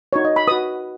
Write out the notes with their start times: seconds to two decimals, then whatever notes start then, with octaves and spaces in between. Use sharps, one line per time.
0.13 D#4 F#4 C#5
0.25 D#5
0.36 B5
0.48 F#4 B4 D#6